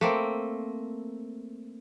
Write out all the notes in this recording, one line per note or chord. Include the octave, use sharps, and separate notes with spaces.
A3 A#3 C4